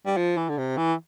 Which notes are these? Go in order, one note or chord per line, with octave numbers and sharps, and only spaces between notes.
G3
F3
E3
D3
C3
E3